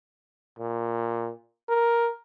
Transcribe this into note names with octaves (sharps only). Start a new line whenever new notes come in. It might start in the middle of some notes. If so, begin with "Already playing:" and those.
A#2
A#4